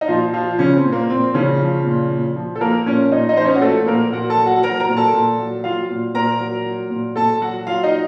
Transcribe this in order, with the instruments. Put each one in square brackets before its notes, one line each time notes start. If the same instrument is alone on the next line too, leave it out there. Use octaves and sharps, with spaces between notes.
[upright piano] D#4
A#2 F3 F4
F3 F4
C#3 F3 C#4
C4
A#2
A#3
A#2 C4
C#3 F3 C#4
F3
A#2
A#2
F3
A4
F3 A#3 A#4
A#2 C#4 C#5
A#2 D#4 D#5
D#4 D#5
F3 C5
C#4 C#5
F#4
F3 A3 A4
A#2 A#3 A#4
A#2 F#4 F#5
A4 A5
F#3
F#4 F#5
F#3 A#4 A#5
A#4 A#5
A#2
A4 A5
A#2
F#3
F#3 F4 F5
A#2
A#2 A#4 A#5
F#3
F#3
A#2
A#2 A4 A5
F#3 F#4 F#5
F#3 F4 F5
D#4 D#5